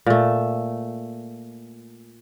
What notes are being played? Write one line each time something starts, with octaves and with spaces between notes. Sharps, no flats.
A#2 A3